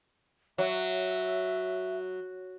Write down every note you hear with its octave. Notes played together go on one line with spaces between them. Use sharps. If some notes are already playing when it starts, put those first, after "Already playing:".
F#3 E5